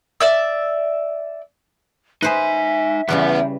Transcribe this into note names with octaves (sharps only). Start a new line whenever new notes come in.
D5 E5 E6
D#4 B4 C5 D#5 E5 G#5
E2 C#3 G3 B3 B4